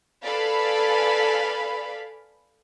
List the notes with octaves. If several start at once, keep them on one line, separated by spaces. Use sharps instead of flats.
A4 B4 D5 F5 G#5 B5